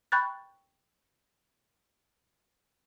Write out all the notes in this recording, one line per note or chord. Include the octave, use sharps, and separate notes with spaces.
G5 B5 C#6 F#6 G6 A6